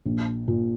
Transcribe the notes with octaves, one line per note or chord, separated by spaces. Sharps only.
A#1
A#2